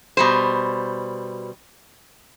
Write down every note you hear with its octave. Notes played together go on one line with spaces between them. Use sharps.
B2 G3 C5